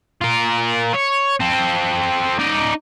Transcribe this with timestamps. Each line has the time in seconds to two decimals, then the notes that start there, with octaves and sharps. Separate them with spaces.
0.21 F4 A#4
0.94 C#5
1.40 C4 A4
2.39 D#4 D5